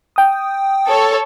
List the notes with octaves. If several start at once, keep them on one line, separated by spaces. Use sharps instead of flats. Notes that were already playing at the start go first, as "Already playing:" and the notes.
G5 D#6
A4 C#5